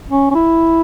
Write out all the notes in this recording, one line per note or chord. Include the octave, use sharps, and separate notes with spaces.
C#4
C#4
E4